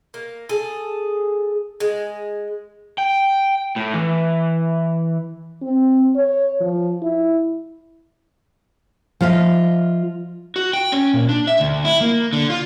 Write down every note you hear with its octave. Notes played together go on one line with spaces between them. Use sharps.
A#3
G#4 A4
G#3
G5
A2
E3
C4
C#5
F3
E4
F3 F4 D#5 E5
F#4
G5
C#4
A#2
D4
E5
D2
E4
A#3
D3
F4